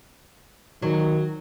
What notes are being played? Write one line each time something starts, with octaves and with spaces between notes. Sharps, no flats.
D#3 F#3